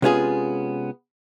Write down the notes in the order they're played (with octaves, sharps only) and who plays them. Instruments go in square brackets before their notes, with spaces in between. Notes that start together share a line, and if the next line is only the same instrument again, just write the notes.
[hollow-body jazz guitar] C3 G#3 B3 C#4 F4 G#4